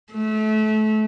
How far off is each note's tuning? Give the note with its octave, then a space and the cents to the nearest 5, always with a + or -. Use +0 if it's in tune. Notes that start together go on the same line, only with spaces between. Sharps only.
A3 -30